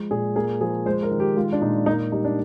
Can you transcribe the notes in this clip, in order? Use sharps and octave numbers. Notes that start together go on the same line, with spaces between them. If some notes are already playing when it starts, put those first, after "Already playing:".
Already playing: F3 G#3
A#2 G#4
A#3 G#4
F3 G#4
G#3 C5
A#4
D#3
G4
G#3 F4
D4
A#2 D#4
A#3 D#4
G3 D#4
D4